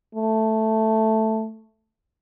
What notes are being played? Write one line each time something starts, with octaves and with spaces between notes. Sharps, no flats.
A3